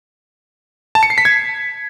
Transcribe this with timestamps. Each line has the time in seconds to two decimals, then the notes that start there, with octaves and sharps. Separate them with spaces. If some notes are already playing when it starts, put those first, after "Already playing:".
0.95 A5
1.03 C#7
1.10 C7
1.18 B6
1.25 G#6